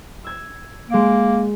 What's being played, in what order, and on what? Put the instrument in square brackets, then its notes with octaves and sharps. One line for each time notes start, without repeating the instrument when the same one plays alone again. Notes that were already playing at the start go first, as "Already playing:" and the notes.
[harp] E6 G#6
[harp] G#3 D7 [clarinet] A#3